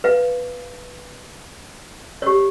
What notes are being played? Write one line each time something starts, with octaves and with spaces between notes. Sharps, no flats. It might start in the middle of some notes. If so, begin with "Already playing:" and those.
B4 F5
G4 C#5